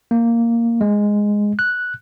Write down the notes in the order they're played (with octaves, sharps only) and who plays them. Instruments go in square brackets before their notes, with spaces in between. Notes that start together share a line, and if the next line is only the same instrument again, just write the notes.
[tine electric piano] A#3
G#3
F#6